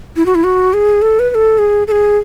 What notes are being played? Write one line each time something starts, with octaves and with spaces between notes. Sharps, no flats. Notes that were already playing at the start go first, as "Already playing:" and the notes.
E4
F#4
E4
F#4
G#4
A4
B4
B4
A4
G#4
A4
G#4